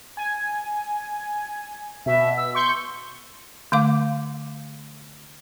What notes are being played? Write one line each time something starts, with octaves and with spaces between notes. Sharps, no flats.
G#5
B2 E5
E6
C6 C#6 G6
D3 A3 F5 D6